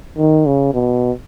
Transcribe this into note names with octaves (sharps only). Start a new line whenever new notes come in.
D#3
C#3
B2